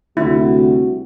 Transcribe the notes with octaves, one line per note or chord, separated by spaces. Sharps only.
D2 C3 G3 E4 F#4